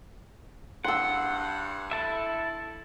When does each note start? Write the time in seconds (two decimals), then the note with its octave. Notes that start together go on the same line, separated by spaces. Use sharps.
0.84 G2 F#5 C6 E6
1.91 E4 A4 E5